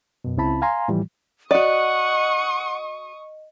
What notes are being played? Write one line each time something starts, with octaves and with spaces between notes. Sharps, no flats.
F#2 B2
C#2 C#3 C4 E4 A5 B5
F5 G#5 A#5 C6
A2 E3 F3 G3
F#4 D5 D#5 F#5 C#6 D#6